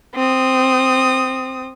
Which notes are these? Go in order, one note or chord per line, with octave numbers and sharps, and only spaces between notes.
C4 D#6